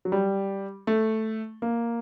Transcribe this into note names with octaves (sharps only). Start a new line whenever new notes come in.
F#3
G3
A3
A#3